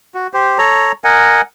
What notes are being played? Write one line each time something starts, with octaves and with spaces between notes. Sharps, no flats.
F#4
G4 C5
A4 C#5 A#5
A#4 D#5 F#5 G#5